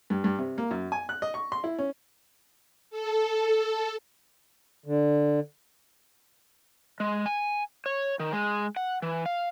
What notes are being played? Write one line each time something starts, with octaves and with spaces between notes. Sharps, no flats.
G2
G2
C3
A#3
F#2
G#5
F#6
D#5
C#6
C6
E4
C#4
A4
D3
G#3
G#5
C#5
D#3
G#3
F#5
E3
F5